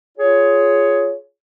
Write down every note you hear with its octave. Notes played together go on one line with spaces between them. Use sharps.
F4 G#4 C#5